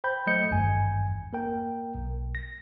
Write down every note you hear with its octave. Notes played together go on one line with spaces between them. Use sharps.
C5 G5 B5 G6
F#3 A3 D#5 G6 C#7
G#1 E2 G2 G#5
A#3 A#4 G5
B1
A#6